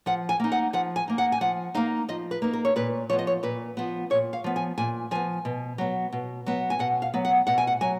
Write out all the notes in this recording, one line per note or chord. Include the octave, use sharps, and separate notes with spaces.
F3 F#5
G#5
A#3 D#4
F#5
F3 F#5
G#5
A#3 D#4
F#5
G#5
F3 F#5
A#3 D#4 F5
F3 D#5
B4
A#3 D#4
A#4
C#5
A#2 B4
F3 B3 C#5
D#5
C#5
A#2 B4
F3 B3
A#2 C#5
F5
F3 B3
G#5
A#2 G#5
F3 B3 G#5
B2
F#3 B3
B2
F#3 B3
G#5
B2 F#5
F5
F#3 B3
F#5
B2 F#5
G#5
F#5
F#3 G#5